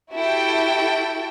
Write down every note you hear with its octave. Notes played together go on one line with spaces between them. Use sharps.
E4 F#4 G4 A4 G5